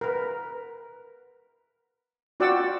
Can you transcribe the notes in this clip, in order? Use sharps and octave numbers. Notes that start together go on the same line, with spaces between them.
A#4 B4
F4 F#4 D5 F#5 G5 E6